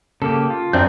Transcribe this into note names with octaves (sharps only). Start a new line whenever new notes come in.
C#3 A#3 G4 A4
F4
F#2 C4 D4 D#4 C#5 G6